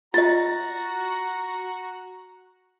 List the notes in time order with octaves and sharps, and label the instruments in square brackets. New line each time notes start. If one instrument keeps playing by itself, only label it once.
[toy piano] F4 D#5 [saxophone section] F#4 [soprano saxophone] A#5 [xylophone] A6